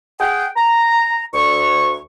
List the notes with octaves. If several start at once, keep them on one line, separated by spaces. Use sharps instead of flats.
G#4 F#5 G5
A#5
D2 C#6